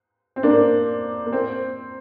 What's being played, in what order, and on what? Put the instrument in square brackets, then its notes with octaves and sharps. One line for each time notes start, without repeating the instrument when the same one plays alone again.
[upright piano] C4
A#3 D4
A#3
C4